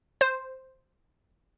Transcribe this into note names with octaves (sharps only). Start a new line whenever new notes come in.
C5